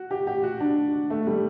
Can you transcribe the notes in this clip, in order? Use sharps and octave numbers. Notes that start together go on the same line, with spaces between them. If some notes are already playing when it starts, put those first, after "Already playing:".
Already playing: F#4
G4
G4
F#4
D4
A3
G3